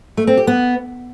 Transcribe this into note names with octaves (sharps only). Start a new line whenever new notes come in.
A3
C4
G4
B3